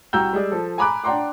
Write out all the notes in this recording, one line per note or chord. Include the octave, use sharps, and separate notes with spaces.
C2 F#4 G5 A#5 E6 G6
G3 G#3 G#4 D5
F3 A4
G#5 A#5 B5 D6 F#6
D4 F#5 G5 A#5 C6 D6